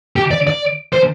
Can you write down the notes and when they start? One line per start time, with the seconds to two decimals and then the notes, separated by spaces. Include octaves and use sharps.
0.16 G4
0.31 D5
0.47 D5
0.93 C5